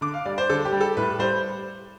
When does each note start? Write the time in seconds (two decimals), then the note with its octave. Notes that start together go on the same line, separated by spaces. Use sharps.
0.01 D3 D6
0.14 F5
0.25 G3 D5
0.38 C5
0.49 D3 A4
0.65 G4
0.72 G3
0.81 A4
0.97 A2 B4
1.19 G3 C5